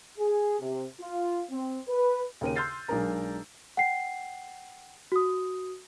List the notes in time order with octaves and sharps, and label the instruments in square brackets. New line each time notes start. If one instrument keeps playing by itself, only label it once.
[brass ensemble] G#4
C3
F4
C4
B4
[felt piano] D#2 C#3 A#4 C#5 D#7
C6 E6 F6 G6 A6 C7
B1 G#3 D4 G#4 A#4 A#5
[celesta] F#5 G5 C7
F#4 D#6